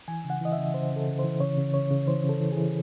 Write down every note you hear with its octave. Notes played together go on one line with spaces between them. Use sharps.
E3 G#5
C#3
F#5
E3 D#5
E5
C#3
C#3 C5
C#3 A4
C#3
E3 C5
C#3 C#5
C#3
C#3 C#5
C#3
E3 C5
C#3
A4
E3
E3 G#4